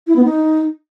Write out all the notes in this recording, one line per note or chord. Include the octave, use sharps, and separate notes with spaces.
E4
B3
D#4